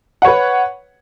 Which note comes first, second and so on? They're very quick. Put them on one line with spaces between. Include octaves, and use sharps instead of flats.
F#5 C#5 B4